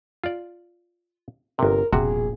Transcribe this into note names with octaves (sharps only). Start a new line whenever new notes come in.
F4 D5
G1 C3 A#4
E1 A#1 C3 F#4 G#4